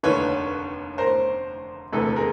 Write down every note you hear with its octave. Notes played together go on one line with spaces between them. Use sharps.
F1 D#2 D3 B4 C#5
A#4 C5
E1 D2 C3 A4 B4
G#4 A#4